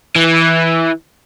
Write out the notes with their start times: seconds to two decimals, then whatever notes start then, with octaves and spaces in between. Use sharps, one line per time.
0.16 E3